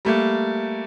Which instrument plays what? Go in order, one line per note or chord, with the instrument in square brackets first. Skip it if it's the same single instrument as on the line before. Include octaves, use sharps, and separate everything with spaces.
[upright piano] G3 A3 A#3